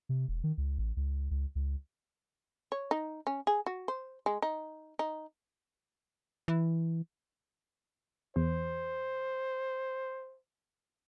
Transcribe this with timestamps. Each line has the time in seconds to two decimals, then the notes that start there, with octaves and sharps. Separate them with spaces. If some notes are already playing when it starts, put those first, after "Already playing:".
0.09 C3
0.28 E1
0.44 D#3
0.58 C#2
0.78 A1
0.97 C#2
1.31 C#2
1.55 C#2
2.72 C#5
2.91 D#4
3.27 C#4
3.47 G#4
3.66 F#4
3.88 C5
4.26 G#3
4.42 D#4
4.99 D#4
6.48 E3
8.36 E2 C5